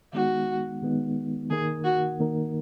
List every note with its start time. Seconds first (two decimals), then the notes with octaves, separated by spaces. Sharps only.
0.13 D#3 G#3 B3 D#4 F#4
0.82 D#3 G#3 B3 D#4
1.50 D#3 A#3 D#4 G#4 A#4
1.84 F#4
2.20 D#3 A#3 D#4 A#4